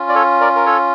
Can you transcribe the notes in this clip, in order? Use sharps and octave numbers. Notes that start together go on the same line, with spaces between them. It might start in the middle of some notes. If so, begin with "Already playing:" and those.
Already playing: C#4 F4
D5
A4 C#5
A#4 D5
A#4
A4 C#5